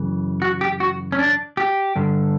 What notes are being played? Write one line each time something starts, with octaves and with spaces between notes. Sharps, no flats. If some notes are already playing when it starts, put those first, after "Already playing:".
Already playing: F#2 C#3 E3
F#4
G4
F#4
C#4
D4
G4
G2 D3